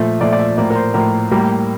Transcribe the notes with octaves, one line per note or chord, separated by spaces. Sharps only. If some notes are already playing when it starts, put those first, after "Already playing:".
Already playing: A#2 F3 A3 C5
A#2 F3 A3 D5
D5
E5
A2 F3 A#3 D5
A#4
C5
A2 F3 A#3 A#4
A2 G3 A#3